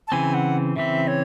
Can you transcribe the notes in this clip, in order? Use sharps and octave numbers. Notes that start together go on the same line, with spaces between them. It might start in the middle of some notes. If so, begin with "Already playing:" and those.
A5
C#3 E3 C4 G#5
F#5
C#3 E3 C4 E5
C#5